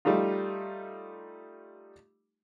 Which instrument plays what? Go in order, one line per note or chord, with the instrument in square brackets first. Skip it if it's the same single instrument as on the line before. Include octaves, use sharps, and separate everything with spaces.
[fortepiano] G3 A3 D#4 F4